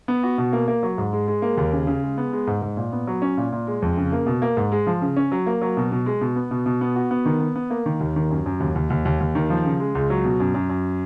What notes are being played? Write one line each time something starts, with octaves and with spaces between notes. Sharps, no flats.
B3
F#4
B2
A#3
A#3
F#3
G#2
G#3
G#3
A#3
D#2
C#3
C#3
G#3
B3
G#3
G#2
G#2
A#2
B3
F#3
C#4
A#2
A#2
G#3
F2
C#3
A#3
B2
A#3
G#2
G#3
F3
C#3
C#4
F#3
A#3
F#3
B2
B2
G#3
B2
B3
B2
B2
B3
F#4
B3
D#3
B3
B3
A#3
D#3
D#2
D#3
F#2
F#2
D#2
D#2
D#2
D#2
D#2
D#3
F3
C#3
G#3
C#2
F#3
B2
F#2
F#2
F#2